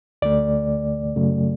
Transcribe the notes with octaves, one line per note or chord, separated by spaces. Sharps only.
D2 D3 A3 D5
F#2 C#3 F#3 A3